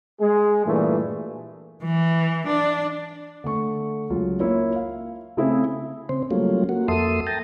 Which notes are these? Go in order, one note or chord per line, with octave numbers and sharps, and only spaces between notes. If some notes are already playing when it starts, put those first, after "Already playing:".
G#3 G#4
G2 A#2 E3 A3
E3
D4
D3 A3 C#6
C#2 F#3 F4
A#3 E4 F4 C#5 E5
F5
C#3 A3 C4 E4 G#4 C5
C#3 C4 C5
F#3 G3 A3 A#3 C#4 F4
A#3 F#4
F2 A#3 A4 E5 C6 D#6
G5 A5 A#5